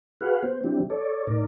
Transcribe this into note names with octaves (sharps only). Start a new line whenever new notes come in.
F#4 G#4 B4 F5 F#5
B3 C5
F#3 G3 C4 D4 E4 G4
A4 C#5 D5
A2 D#4 A#4 D5